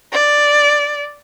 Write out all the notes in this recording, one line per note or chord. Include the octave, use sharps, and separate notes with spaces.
D5